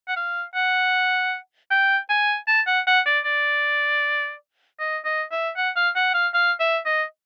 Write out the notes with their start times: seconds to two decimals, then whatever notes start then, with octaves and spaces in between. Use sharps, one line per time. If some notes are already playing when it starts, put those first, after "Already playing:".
0.08 F#5
0.16 F5
0.55 F#5
1.70 G5
2.09 G#5
2.48 A5
2.67 F#5
2.87 F#5
3.06 D5
3.25 D5
4.79 D#5
5.05 D#5
5.31 E5
5.56 F#5
5.76 F5
5.96 F#5
6.14 F5
6.34 F5
6.60 E5
6.85 D#5